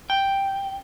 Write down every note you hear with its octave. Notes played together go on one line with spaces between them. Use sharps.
G5